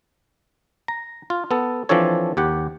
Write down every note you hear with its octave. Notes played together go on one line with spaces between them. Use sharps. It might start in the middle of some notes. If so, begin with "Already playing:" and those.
A#5
F4
B3 A4
E3 F3 C4 D4 A4 C#5
D#2 G4 F#5